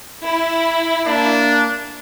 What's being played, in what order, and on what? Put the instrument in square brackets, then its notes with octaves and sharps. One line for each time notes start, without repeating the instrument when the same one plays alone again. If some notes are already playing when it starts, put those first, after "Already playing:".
[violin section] E4
[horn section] A#3 D4